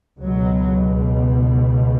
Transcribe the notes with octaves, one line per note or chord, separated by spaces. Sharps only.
C#2 B2 F#3